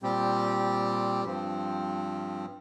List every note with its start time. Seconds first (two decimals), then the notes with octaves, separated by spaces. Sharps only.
0.02 A#2 G3 C4 G4
1.24 G2 F3 C4